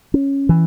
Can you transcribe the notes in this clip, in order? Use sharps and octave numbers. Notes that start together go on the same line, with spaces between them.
C#4
E3